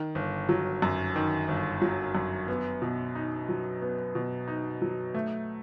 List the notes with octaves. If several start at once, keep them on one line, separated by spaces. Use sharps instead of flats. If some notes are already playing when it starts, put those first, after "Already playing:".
Already playing: D#3
G1
F#3
F#2
D#3
G1
F#3
F#2
B3
B2
D#4
F#3
B3
B2
D#4
F#3
A3